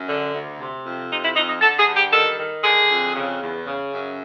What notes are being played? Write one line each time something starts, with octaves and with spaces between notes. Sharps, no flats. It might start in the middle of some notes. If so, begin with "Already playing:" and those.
Already playing: F#2
D3
D2
C3
F2
C3 D#4
E4
F2 D#4
D#4
D3 A4
G#4
G2
G4
D#3 A4
D#3
D3 G#4
F2
C#3
E2
C#3
F#2